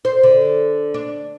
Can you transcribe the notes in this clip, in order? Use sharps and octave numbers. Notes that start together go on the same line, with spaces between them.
C5
D3
D4